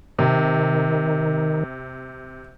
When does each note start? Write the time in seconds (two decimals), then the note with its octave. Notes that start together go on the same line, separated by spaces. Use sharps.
0.19 C3 D#3